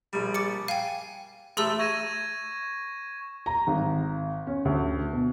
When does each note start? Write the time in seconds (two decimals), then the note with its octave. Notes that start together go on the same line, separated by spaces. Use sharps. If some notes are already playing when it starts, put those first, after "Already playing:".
0.13 A#1 G3
0.34 D6 A6 C#7
0.68 F5 G5 G#5
1.57 A1 A3 G#4 C6 E6
1.79 C#6 G#6 A#6 D#7 E7
3.46 A#5
3.67 G#1
4.47 C#4
4.65 D2
5.12 B2